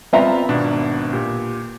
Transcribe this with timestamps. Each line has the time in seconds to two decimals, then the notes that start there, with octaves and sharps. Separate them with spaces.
0.13 B3 C4 F4 E5 A#5
0.49 G#1 B2 D4
1.13 A#2 G4